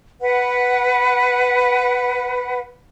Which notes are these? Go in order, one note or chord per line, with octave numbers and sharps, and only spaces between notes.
B4 F#5